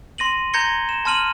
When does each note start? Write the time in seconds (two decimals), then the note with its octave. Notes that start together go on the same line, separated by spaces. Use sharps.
0.18 C6 A#6 D#7 F#7
0.54 A#5 G6 G#6 A#6 C#7 G7
0.89 E7
1.05 A5 C6 F6 D#7 F#7